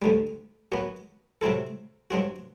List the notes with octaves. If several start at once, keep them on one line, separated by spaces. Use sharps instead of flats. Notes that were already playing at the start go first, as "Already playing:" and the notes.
D2 D3 G3
F#2 F#3 B3
C3 F#3 C4 E4 A4
G2 F#3 C4 F#4